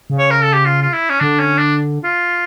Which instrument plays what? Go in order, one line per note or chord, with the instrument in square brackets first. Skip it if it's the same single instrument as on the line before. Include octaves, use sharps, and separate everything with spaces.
[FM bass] C#3
[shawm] C#5
A#4
A4
G4
F4
F4
E4
C#4
[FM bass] D3 [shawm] D4
[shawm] C#4
D4
F4